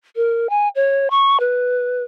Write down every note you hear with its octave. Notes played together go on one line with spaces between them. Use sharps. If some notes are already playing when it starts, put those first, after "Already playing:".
A#4
G#5
C#5
C#6
B4